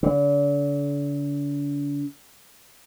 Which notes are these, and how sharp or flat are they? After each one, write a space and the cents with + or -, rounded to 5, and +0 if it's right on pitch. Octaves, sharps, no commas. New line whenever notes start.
D3 -40